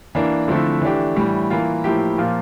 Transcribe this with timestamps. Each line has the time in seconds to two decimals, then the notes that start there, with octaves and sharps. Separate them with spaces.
0.15 E3 A#3 D4
0.48 D3 F3 A3 C4 E4
0.82 E3 A3 D4 G4
1.16 A2 E3 G3
1.50 E3 A#3 F4
1.84 A2 F3 A#3 E4 G4
2.18 A#2 F3 A#3 F4